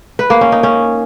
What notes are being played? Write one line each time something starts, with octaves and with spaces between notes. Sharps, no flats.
B4
A#3
C#4
D#4
C#4